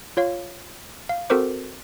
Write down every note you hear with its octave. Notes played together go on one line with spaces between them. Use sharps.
F4 C#5 F5
F5
C4 F#4 A4 A#4 C5 D6